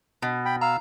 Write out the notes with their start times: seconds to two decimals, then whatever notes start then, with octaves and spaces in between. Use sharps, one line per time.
0.22 B2
0.45 G5 B5
0.61 F5 A#5 E6